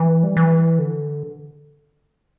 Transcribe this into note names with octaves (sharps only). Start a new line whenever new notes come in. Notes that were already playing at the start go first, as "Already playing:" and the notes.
Already playing: E3
G3
E3
D3